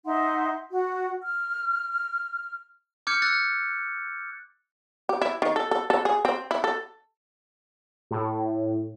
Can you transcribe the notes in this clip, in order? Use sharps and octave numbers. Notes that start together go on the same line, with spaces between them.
D#4 E5 F#5 C6
F#4 F#5
F6
D6 F6 G6 G#6 C#7
E6 F#6 A6 C#7
G4
E4
D#3
A4
A4
A4
G#4
C4
E4
A4
A2